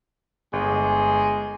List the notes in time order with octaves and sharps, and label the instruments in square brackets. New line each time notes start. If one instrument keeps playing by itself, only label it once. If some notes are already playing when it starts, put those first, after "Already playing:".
[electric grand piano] G1 [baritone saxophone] G#3